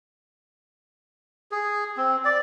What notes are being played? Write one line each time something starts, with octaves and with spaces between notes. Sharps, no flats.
G#4
C4
D5